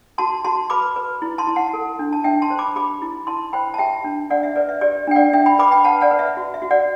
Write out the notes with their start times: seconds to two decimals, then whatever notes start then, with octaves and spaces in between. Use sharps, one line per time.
0.18 F#4 A5 C6
0.45 F#4 A5 C6
0.70 B4 B5 D6
0.96 B4
1.22 E4
1.38 A5 C6
1.47 E4
1.56 F#5 A5
1.73 A4
1.99 D4
2.13 A5
2.24 D4 E5 G5
2.42 A5 C6
2.50 C5
2.59 B5 D6
2.76 G4 B5 D6
3.02 E4
3.27 E4 A5 C6
3.53 C5 G5 B5
3.74 A5
3.78 G4 E5 G5
4.04 D4
4.30 D4 D5 F#5
4.43 E5
4.56 B4 D5
4.69 E5
4.81 G4 D5
5.07 D4 G5
5.16 D5 F#5
5.33 D4 E5 G5
5.46 G5 B5
5.59 B4 B5 D6
5.71 G5 B5
5.84 B4 F#5 A5
6.01 D5 F#5
6.11 B4
6.19 E5
6.37 F#4
6.54 E5
6.62 F#4
6.71 D5 F#5